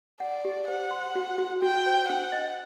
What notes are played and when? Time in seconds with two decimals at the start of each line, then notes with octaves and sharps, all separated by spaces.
0.20 D5 F#5
0.45 G4
0.68 C5 F#5
0.91 C6
1.15 F#4
1.38 F#4
1.62 F#4 G5
1.86 C5
2.09 D4 F#5
2.32 D#5